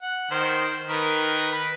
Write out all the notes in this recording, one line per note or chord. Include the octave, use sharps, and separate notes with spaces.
F#5
D#3 C5
D#3 A#4 B4
B4